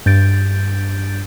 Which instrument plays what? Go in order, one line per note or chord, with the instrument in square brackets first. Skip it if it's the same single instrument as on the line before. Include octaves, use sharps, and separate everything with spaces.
[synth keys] G2 G6 A6 D7